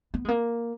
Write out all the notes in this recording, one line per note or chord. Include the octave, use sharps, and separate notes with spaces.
B3
G#3
A#3